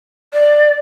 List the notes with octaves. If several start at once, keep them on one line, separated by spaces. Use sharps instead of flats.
D5